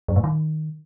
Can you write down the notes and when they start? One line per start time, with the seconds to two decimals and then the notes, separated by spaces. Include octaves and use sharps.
0.08 F#2
0.16 A2
0.24 D#3